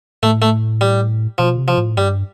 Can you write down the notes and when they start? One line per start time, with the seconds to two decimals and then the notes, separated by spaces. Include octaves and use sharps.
0.23 A2 A3
0.42 A3
0.81 G3
1.38 B2 F3
1.58 C3
1.68 F3
1.77 A2
1.97 G2 G3